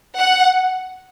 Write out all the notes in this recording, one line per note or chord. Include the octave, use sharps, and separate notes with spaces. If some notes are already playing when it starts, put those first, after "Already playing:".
F#5